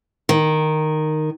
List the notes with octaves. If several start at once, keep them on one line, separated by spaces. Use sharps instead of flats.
D#3